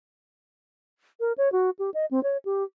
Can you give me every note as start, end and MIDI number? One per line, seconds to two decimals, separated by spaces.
1.20 1.33 70
1.38 1.51 73
1.52 1.70 66
1.79 1.90 67
1.94 2.06 75
2.11 2.23 60
2.23 2.37 73
2.45 2.63 67